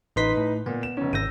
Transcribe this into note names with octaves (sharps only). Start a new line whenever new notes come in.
A1 D#4 B4 D#5 C6 B6
A2
A#2 B3
E7
F1 C#4
G#1 E6 G6 A#6 D#7